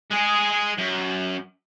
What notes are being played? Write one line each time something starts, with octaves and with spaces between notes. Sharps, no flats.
G#3 G#4
F#2